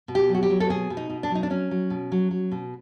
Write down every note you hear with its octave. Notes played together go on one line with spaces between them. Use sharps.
B2
G4
F#3
F#4
G4
F#3
A4
B2 G#4
B2
D#4
B2
D4
F#3 D#4
D4
F#3 C#4
F#3
B2
F#3
F#3
B2